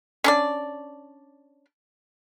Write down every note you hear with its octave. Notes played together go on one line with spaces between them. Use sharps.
C#4 D4 D5